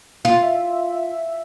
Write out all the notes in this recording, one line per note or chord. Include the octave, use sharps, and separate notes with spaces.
F4
E5